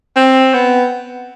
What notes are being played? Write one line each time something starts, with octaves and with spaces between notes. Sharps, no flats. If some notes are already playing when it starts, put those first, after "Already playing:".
C4
B3